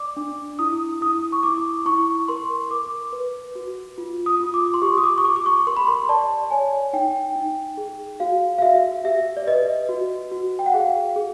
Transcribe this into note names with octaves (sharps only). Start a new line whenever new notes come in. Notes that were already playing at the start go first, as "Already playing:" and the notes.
Already playing: D5 D6
D4
E4 D#6
E4 D#6
C#6
E4 D6
E4 C#6
A#4 C6
A#4 D6
B4
F#4
F4
D#6
F4
D6
C6
G4 C#6
D#6
D6
C#6
G4 D6
D6
C#6
A#4 C6
B5
C6
D5 A5
C#5 G#5
D#4 G5
D#4
G#4
F#4 F5
F5
F#4 E5
G4 E5
D5
B4 D#5
F#4
F#4
G5
F#5
G#4 F5
G#4